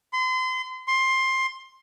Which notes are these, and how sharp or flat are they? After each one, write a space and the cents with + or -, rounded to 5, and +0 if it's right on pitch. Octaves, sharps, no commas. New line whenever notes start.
C6 -35
C6 +15